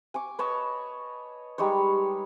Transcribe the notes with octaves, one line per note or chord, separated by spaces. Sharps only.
G#5 C#6 D6
B4 C#5 D#5 A5
G3 G#3 D#4 C#5